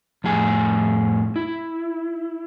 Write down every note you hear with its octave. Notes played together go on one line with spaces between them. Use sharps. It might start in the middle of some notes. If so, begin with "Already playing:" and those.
F2 A2 G#4 G#5
E4